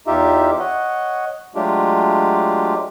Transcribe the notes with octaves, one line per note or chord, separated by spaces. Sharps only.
E2 D#4 F4 G4 E5
C#5 D#5 F#5
F#3 G#3 A3 D4 F4 G4